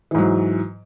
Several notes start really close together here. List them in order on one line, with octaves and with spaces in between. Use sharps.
E3 G#2 F#3